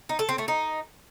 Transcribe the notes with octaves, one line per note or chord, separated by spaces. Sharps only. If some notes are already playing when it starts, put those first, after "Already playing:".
D#4
A4
C4
A3
D#4